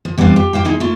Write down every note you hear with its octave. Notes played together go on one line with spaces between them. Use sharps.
F3
E2 G3 B3 C4 D4 F5
G4
G4 C5 F5 G5
G#3 A#3 D#4 E4 G#4
A3 A#3 E4 F4